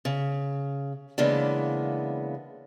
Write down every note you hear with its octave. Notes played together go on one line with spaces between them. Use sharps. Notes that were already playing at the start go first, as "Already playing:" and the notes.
C#3
C#3 E3 G#3 A#3 B3 D4